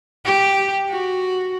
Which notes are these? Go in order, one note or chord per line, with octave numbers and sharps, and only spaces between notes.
G4
F#4